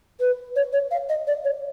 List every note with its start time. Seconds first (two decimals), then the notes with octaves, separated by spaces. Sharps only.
0.20 B4
0.56 C#5
0.73 C#5
0.91 F5
1.09 D#5
1.27 D5
1.44 C#5